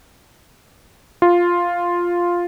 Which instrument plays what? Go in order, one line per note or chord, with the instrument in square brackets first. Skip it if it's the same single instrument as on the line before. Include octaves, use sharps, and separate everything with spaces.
[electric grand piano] F4